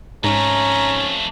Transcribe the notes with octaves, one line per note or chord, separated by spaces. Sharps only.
F2 G#2 A3 C#4 A#5